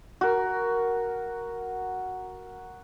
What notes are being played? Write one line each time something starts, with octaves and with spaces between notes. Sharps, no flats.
F#4 A#4